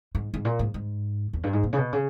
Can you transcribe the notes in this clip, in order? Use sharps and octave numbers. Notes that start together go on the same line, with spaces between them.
G#2
G#2
A#2
G#2
G#2
E2
G2
G#2
A#2
C#3
B2
C#3